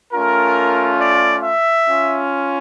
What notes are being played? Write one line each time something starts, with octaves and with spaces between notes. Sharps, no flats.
A3 C#4 F4 A#4
D5
E5
C#4 F4